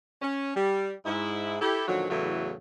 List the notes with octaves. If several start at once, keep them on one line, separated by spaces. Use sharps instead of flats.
C#4
G3
G#2 E4
E4 G4 A4
A#2 D3 D#3 F3 F#3
E2 A2 C#3 E3 F#3 A3